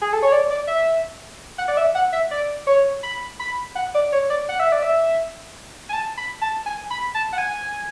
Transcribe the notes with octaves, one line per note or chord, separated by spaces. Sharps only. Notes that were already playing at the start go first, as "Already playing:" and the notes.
G#4
A4
C#5
D5
D5
E5
F#5
D5
E5
F#5
E5
D5
C#5
B5
B5
F#5
D5
C#5
D5
F#5
E5
D5
E5
G#5
A5
B5
A5
G#5
B5
A5
F#5
G#5